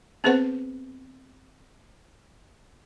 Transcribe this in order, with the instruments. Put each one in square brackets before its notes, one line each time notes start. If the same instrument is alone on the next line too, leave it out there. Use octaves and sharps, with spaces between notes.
[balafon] B3 C4 G#4 B4 C5 F#5